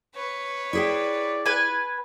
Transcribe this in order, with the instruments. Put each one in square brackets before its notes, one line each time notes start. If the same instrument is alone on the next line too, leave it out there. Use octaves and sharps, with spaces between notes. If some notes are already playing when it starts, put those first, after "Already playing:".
[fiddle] B4 C#5
[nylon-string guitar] E4 G#4 G5 [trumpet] D5
[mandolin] B4 G#5